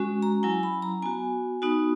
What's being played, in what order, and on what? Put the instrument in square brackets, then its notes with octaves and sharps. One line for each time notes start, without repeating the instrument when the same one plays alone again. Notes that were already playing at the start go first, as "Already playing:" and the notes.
Already playing: [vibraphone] G#3 C#4 F#4
A#5
F#3 C#4 E4 G#5
B5
A#5
B3 F#4 G#5
B3 D#4 F#4